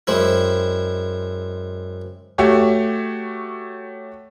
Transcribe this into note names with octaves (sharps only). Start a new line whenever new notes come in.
F#2 G#3 C4 E4
A3 F#4 G4 C#5